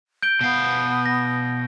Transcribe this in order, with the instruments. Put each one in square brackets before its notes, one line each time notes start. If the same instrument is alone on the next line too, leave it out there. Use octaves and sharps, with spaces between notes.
[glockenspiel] G6 D7 G7
[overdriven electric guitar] B2 F5 [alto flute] B3
[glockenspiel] A#6